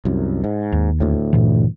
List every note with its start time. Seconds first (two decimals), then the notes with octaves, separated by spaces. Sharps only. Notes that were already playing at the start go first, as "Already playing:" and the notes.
0.05 C2 F#2
0.44 G#2
0.72 D#2
1.00 D2 A2
1.33 G2 A#2 E3